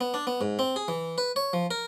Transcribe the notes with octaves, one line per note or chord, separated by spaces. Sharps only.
B3
D4
B3
G#2
C4
G#4
E3
B4
C#5
F3
A#4